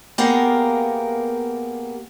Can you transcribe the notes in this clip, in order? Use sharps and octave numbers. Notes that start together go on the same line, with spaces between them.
A#3 B3 G4 G#4 A#4 F5